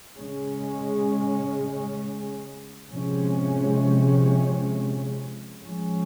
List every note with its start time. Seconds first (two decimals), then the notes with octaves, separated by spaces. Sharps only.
0.15 C#3 G#3 C#4
2.89 C3 F3 G#3 C#4
5.64 F3 G#3 C#4